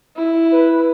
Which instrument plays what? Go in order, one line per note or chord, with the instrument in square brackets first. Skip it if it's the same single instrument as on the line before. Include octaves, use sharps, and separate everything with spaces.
[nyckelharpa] E4
[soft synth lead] B4